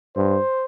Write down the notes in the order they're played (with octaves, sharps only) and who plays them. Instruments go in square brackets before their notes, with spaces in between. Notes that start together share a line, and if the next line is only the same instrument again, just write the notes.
[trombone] G2 [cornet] C5